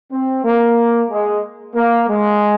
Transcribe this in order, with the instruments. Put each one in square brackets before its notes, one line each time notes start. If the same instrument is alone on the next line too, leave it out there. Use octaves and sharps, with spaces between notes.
[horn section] C4
A#3
G#3
A#3
G#3